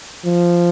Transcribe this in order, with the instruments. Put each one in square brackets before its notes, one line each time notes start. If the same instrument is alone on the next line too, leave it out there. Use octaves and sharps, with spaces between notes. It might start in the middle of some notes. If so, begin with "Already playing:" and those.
[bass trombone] F3